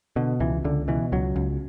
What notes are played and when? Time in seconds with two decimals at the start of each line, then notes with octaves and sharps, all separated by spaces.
0.16 B2 D3
0.40 C#2 E3
0.64 C#2 D3
0.88 B2 E3
1.12 C#2 F#3
1.36 C#2